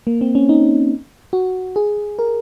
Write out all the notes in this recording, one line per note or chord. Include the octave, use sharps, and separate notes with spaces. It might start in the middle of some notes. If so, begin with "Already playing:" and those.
A#3
C4
C#4
D#4
F#4
G#4
A#4